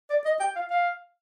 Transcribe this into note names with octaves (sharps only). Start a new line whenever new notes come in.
D5
D#5
G5
F5
F5